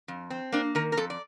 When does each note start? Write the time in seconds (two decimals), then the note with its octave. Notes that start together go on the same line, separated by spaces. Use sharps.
0.08 F2
0.30 C4
0.52 A#3 D4
0.75 D#3 A#4
0.92 A#4
0.97 F2 A4
1.10 D5